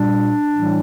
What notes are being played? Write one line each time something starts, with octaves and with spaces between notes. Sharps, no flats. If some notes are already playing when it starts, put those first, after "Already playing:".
Already playing: A#2 G3 D4
A2 E3 G3